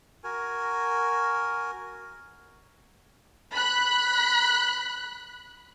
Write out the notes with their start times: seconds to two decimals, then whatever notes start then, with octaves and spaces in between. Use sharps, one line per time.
0.24 F#4 A#4 G#5
3.52 B5 F#6